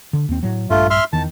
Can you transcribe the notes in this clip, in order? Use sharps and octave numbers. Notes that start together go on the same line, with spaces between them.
D3
D#2 C4
A2 F#3
A#1 G2 A3 F4
E5 C6 F6
E2 D#3 A5